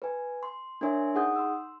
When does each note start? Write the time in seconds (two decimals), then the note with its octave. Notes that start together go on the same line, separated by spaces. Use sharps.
0.02 B4 G#5
0.43 C6
0.81 D4 A#4 C#5 E5 G#5 C6
1.14 D#4 G#4 F#5 D#6 G6
1.35 C6 E6